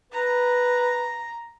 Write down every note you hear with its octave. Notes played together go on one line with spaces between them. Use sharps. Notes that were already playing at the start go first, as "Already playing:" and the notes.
B4 A#5